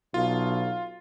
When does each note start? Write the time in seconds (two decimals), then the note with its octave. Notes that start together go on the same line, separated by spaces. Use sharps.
0.14 B1 F4